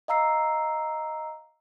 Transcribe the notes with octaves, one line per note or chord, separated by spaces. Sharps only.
D#5 F5 A#5 E6 C7